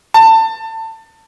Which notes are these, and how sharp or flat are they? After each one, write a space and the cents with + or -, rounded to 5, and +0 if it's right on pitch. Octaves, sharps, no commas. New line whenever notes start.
A5 +25